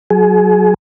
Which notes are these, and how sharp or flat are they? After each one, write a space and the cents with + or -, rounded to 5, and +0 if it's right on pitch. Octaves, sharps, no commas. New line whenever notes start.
F#3 +0 G#4 +30